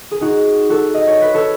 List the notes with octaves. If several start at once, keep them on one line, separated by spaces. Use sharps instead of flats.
G#4
D#4 F#4
F#4 A4
D#5
C#5
B4
A4 C#5